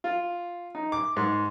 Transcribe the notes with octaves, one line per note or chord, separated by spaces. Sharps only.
F4
D#4
D6
G#2